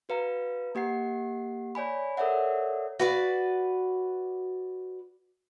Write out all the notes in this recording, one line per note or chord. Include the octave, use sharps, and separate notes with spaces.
F#4 B4 F5 A#5
A#3 G4 F#5 C7
C#5 D5 G#5 B5
A4 A#4 C#5 D5 E5 F#5
F#4 B4 D5